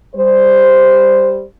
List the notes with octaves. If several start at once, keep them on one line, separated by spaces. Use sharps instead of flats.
G3 C5